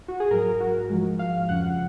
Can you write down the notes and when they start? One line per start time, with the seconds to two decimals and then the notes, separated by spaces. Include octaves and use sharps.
0.08 F#4
0.20 G#4
0.31 G#2 F#3 A#4
0.61 F#4
0.90 G#2 F3 G#3
1.19 F5
1.49 F2 C#3 F3 F#5